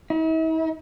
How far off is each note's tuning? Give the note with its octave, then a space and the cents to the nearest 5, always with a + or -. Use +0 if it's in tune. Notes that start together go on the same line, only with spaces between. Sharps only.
E4 -45